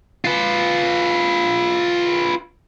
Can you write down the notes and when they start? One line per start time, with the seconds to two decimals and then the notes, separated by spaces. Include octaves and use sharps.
0.25 F4 B4